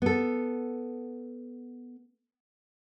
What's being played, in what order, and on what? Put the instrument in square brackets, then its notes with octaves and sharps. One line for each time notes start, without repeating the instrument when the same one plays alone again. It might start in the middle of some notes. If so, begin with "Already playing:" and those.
[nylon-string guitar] B3 A4